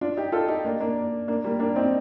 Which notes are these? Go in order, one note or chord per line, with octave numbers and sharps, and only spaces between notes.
D4 F4
D#4 G4
F4 A4
D#4 G4
A#3 D4
A#3 D4
A#3 D4
G3 A#3
A#3 D4
C4 D#4